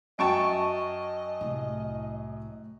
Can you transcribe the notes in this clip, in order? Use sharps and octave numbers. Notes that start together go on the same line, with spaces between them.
F#2 F#4 D#5 G5 A5 C#6 D7
C2 A2